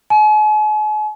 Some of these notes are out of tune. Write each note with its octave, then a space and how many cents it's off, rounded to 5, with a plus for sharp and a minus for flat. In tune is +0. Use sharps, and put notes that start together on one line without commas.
G#5 +45